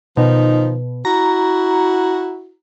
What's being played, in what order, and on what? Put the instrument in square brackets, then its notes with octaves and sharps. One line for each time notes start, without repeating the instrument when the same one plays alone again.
[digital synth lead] B2 [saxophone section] D#3 F3 D#4
[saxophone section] E4 F#4 [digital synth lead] A#5